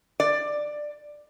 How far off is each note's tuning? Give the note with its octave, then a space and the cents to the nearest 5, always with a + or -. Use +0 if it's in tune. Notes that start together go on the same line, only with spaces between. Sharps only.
D5 +15